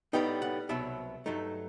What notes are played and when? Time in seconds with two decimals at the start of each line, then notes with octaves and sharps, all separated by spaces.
0.13 A2 G3 B3 D#4 G5
0.42 F#5
0.69 C2 B2 F#3 E5
1.26 G2 F#3 A3 D#4